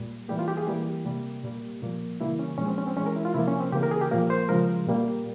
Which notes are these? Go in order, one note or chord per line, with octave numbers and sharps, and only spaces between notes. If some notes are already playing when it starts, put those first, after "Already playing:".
Already playing: A#2 G3
E3 G3 A#3 G4
F4
G4
G#4
E3 G3 A#3 G4
C3 G3 A#3
A#2 G3 A#3
A#2 F3 A#3
C#3 E3 G3 A#3 E4
C#4
A#2 F3 G#3 C#4
C4
C#4
C4
E3 G#3 C#4
A#4
E4
F4
C3 F3 A#3 E4
C#4
C4
C#3 E3 A#3 G4
A#4
G#4
G4
A#2 F3 A#3 A#4
C5
C#3 F3 G#3 A#4
A#2 G3 A#3